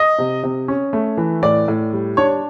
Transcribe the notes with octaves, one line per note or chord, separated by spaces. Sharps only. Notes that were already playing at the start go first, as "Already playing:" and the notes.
Already playing: D#5
C3
C3
C#4
A3
E3
A2 D5
A2
G3
D4 C#5